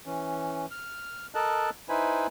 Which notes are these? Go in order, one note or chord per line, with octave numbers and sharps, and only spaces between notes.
E3 C#4
F6
A4 A#4 D#5 A5 F#6
D#4 E4 B4 C5 G#5 B5